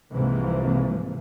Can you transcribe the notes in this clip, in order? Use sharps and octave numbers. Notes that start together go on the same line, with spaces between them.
C2 G#2 C3 E3 F3 A#3